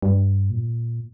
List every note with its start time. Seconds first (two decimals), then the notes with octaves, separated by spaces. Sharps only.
0.02 G2
0.50 A#2